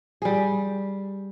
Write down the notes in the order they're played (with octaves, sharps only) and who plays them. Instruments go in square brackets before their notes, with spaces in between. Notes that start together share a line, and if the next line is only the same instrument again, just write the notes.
[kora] G3 G#4